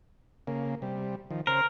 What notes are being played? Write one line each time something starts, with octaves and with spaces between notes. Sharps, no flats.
C#3 A#3
C3 G3
D#3 F3
C#3 A#4 C5